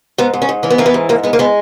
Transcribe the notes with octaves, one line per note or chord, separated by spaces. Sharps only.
G#2 B3
G#2
C#4
G#2
E3 C#4
B3
E3 A#3
B3
G#2
G#2 A#3
G#3 B3
A#3
G#3 B3